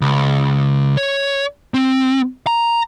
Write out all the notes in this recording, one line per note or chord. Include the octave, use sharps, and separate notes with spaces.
C#2
C#5
C4
A#5